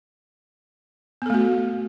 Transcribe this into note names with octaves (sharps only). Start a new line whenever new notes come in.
A3 B3 F#4 A4